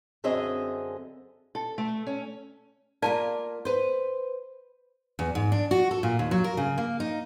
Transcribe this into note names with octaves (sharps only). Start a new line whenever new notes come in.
F#2 D3 C4 G#4 D#5 E5
A4
A3
C#4
A#3 F4 A#4 D5 F5 A5
B4 C5
E2
G#2
D4
F#4
A4
A#2
D#2
F#3
A#4
C#3
A#3
D#4